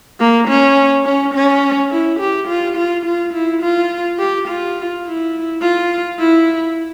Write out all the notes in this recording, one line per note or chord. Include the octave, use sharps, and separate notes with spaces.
A#3
C#4
C#4
C#4
E4
G4
F4
F4
F4
E4
F4
G4
F4
E4
F4
E4